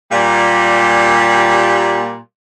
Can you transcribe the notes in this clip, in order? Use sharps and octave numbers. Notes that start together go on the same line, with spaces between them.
A#2 G3